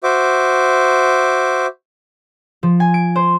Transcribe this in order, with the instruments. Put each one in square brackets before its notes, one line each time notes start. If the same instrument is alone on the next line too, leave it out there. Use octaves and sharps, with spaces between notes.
[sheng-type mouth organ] F#4 C5 E5 D6
[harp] F3
G#5
D7
C5